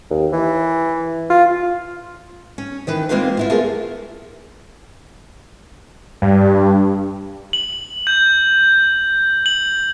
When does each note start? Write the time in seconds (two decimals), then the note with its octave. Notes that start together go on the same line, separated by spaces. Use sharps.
0.10 D#2
0.33 E3
1.30 F4
2.58 C#4
2.87 D#3 E3 B4
3.09 G#3 A#3 C4 F4 B4 F5
3.37 B3 E4 F4
3.50 A3 F4 G#4 A#4
6.22 G2
7.53 F#7
8.07 G6
9.46 F#7